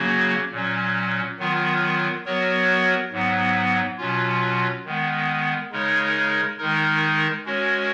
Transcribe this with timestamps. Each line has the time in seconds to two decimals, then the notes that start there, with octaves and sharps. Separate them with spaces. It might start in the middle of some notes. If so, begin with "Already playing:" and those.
Already playing: C#3 F#3 A#3 C#4 F#4
0.52 A#2 F#3 C#4
1.39 D#3 F#3 B3 F4 A#4
2.25 F#3 B3 F#4 A#4 C#5
3.12 G#2 F#3 B3
3.98 B2 F#3 C#4 F4
4.85 D#3 G#3 B3
5.72 C#3 G#3 D#4 A#4 C#5
6.58 D#3 G#3 D#4 A#4
7.45 G#3 C#4 F#4 A#4 C#5